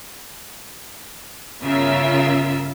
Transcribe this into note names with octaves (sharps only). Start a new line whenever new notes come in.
G1 C#3 F4 A#4 E5 E6